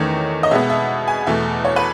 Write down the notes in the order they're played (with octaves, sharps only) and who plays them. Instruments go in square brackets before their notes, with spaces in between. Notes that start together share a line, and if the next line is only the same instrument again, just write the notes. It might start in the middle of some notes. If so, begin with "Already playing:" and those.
Already playing: [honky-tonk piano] E2 D#3 A3 C#4 C#5
D#5
B2 G#3 B3 E5
E5
G#5
E2 B2 A3 E5
C#5
B4